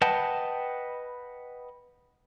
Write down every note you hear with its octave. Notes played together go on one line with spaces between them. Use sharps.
B4 D#5 F#5 G5 A5